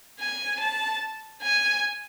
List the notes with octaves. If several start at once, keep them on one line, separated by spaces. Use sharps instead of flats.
G#5
A5
G#5